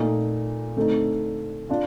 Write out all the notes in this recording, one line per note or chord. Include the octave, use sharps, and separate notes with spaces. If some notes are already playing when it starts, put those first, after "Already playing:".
Already playing: A#2 A3 D#4
D3 A3 C4 D#4
D4 F4